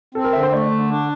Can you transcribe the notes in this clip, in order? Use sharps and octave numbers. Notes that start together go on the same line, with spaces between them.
C4 A4
A#4
D3 E5
C5
A3 D5
D3
D4